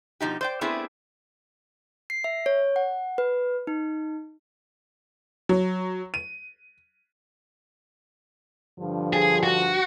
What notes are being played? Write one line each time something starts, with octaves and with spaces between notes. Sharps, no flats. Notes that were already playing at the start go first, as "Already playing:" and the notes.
B2 F3 D#4 G4
C5 D5 G5
A3 B3 C4 D4 E4 G#4
C7
E5
C#5
F#5
B4
D#4
F#3
D#7
G2 D3 F3
G#4
F#4